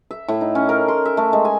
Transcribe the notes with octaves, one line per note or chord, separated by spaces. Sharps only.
E5
A2
D#4
C#4
A#4
C6
E5
A3
G#3
G#5